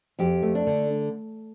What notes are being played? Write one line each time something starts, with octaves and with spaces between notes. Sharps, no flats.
F2 G4
A3
D4
D3